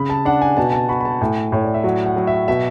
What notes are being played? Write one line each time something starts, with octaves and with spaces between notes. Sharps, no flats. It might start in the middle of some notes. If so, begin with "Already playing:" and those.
Already playing: C#3 B5
A5
D4 F#5
G#5
B2 A5
A5
F#4 B5
B5
A5
A2 G#5
A2 C#5
D5
E5
F#3 F#5
F#5
F#3
E5
B2 E5